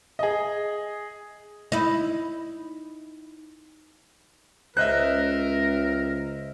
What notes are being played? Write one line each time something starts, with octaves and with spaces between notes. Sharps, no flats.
G#4 D#5
D#4 E4
C#2 A#4 C5 D#5 E5 F#6